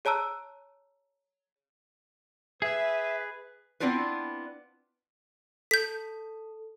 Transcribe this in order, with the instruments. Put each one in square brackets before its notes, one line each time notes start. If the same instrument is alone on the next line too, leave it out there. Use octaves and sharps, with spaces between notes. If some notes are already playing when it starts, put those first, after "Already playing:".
[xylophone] G#4 C#5 A5 A#5 E6 F#6
[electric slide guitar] G#4 [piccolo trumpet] B4 [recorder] E5
[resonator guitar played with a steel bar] B3 C4 D4 E4 F4 B4
[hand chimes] A4 [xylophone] G6 B6